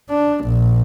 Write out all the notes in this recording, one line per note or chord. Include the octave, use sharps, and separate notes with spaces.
D4
A#1